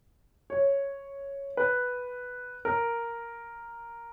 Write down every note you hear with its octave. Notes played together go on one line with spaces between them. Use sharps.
C#5
B4
A#4